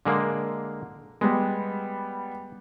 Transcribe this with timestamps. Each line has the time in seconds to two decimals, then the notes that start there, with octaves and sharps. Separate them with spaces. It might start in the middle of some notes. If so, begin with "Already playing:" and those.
0.05 D3 G#3 A#3
1.21 G3 G#3 B3